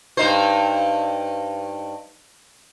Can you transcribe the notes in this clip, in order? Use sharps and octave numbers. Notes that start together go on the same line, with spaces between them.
G2 D#4 C5